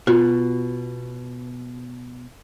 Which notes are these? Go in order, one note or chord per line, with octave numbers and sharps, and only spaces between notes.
B2 F4 F#4